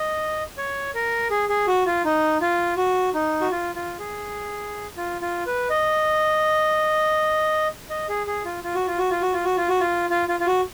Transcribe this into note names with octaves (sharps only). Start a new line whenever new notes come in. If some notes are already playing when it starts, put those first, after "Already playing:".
Already playing: D#5
C#5
A#4
G#4
G#4
F#4
F4
D#4
F4
F#4
D#4
F#4
F4
F4
G#4
F4
F4
B4
D#5
D#5
G#4
G#4
F4
F4
F#4
F4
F#4
F4
F#4
F4
F#4
F4
F#4
F4
F4
F4
F4
F#4